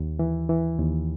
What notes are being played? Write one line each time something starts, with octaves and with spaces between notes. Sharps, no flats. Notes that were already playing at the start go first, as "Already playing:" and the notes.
Already playing: D#2
E3
E3
D#2